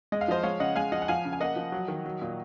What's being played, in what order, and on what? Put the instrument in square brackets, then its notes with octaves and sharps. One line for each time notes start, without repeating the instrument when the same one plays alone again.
[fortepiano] G#3 D#5
F5
F3 C5 D#5
G#3 C#5 F5
C#3 D#5 F#5
G#3 F5 G#5
F3 D#5 F#5
F#5
F3 F5 G#5
C#3
G#5
A#3 D#5 F#5
F3
F#3
D#3
F#3
A#2